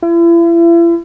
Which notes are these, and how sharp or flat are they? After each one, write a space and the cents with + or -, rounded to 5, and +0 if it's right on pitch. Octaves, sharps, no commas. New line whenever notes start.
E4 +40